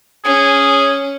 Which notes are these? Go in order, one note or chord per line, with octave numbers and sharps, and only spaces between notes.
C#4 G#4